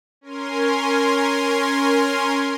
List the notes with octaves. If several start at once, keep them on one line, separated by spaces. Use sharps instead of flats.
C#4 A#4 G#5 C6